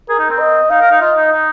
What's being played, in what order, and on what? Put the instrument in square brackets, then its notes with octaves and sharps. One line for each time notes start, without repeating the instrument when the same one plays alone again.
[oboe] G#4 [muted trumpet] A#4
[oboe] D#4
C4
[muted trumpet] D#5
[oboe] D#4 [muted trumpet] F5
[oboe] A#4
D#4
[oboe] F4 [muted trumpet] D#5
[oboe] D#4
D#4